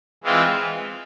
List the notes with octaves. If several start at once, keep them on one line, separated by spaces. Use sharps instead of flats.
E3 G#3 C4 F4